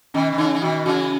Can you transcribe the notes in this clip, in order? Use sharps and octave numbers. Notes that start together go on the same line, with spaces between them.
B2 D#3 C#4
D#3
C#3 E3 D#4
E3
B2 D#3 F#4
C#3 E3 F#4